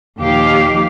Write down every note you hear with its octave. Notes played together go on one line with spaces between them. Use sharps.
D#2 A#2 D#3 F3 G4 F5